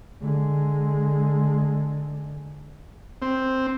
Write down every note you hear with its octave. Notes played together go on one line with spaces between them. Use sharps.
D3 G#3
C4